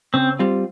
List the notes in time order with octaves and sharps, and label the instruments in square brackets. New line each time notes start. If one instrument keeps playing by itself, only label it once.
[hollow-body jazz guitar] C#3 [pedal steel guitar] C4
[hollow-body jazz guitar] G3 C4 F4